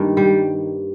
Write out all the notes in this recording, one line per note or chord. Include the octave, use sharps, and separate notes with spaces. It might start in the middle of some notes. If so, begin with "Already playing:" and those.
Already playing: G2 D#3 A#3
G3